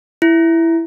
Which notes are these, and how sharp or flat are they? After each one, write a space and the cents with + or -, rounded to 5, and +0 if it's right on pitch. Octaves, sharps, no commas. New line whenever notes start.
E4 +5